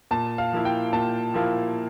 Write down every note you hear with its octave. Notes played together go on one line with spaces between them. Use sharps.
A#2 A5
F5
F3 A#3 E4
G5
A#2 A5
F3 A#3 E4